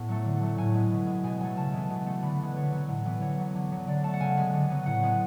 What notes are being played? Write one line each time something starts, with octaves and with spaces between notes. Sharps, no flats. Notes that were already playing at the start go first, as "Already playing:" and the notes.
Already playing: A2 B3
F#3 A3
D3
F#3 A3
A2 G#5
G#3 B3
B2
G#3 B3
B2 G#5
F#3 A3 G#5
C#3 A5
E3 G#3 B3
B2
A3
D3 B5
G#3 B3 B4
D3 C#5
F#3 B3
A2
E3 B3
D3 C#5
F#3 B3
D3
F#3 B3
D3 D5
A3 A5
F#5
C#3 G#5
G#3 B3
D3
F#3 B3
A2 F#5
G#3 B3